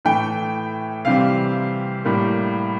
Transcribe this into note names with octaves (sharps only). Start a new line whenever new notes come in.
A2 E3 A3 G5
C3 E3 G3 C4 F5
A2 G3 A#3